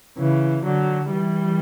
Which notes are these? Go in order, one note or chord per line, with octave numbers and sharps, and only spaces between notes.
C#3 E3
D3 F#3
E3 G3